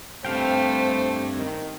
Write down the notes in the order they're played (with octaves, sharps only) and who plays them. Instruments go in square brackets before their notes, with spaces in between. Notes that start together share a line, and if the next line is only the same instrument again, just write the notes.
[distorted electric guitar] G2 [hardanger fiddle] A3 [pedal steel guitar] C4 F5 G5 [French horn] C5
[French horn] D#3